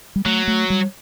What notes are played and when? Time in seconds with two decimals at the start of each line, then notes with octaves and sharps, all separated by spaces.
0.16 G3
0.26 F#3 A3
0.48 A3
0.70 G3